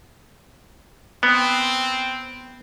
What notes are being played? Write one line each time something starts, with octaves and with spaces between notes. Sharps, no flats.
B3 C4